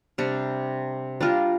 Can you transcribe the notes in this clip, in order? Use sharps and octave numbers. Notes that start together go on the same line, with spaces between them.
C3 G3 D4
G3 D4 F4 A#4